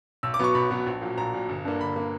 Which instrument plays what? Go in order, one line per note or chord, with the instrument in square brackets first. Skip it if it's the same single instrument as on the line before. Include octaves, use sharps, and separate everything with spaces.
[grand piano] B1 E6
D6
B2 F#3 B3 C#6
B1 B5
B2 F#3 B3
A#1
A#2 F#3
A#1 A#5
A#2 F#3
G1
G2 D3 A#3
G1 B5
D3 A#3